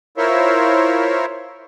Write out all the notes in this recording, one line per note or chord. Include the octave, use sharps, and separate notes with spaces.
E4 F4 A#4 C5 C#5 E5